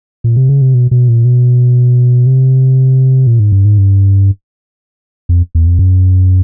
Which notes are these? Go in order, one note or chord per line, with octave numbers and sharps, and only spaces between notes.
A#2
C3
C#3
C3
B2
B2
A#2
B2
C3
A#2
G#2
G2
G#2
G2
F2
E2
F2
F#2